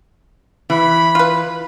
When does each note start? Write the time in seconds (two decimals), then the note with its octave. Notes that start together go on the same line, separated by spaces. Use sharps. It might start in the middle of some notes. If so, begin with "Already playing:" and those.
0.70 E3 B5
1.15 F4 B4